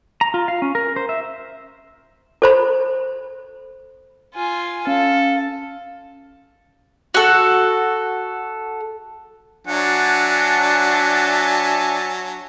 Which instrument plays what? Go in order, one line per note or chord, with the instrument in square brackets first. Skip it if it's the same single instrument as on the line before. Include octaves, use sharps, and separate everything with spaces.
[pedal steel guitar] A#5
F4
F5
C#4
A#4
C5
E5
[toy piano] A4 C5 B5
[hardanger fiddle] F4 G#5
[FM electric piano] C#4 [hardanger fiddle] A4 [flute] F5
[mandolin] F#4 A4
[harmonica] F#3 [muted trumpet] D4 [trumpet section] E5 G#5 A5 [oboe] F#5